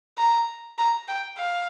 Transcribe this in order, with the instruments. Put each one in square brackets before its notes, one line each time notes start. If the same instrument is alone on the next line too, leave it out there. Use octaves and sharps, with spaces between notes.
[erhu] A#5
A#5
G5
F5